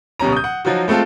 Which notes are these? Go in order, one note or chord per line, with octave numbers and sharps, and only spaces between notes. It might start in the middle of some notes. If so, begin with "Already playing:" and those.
D1 B2 G3 C#4 A#5
D#6 G6
F#5
F3 F#3 D#4 F4 F#4
G#3 A3 C4 F4 A4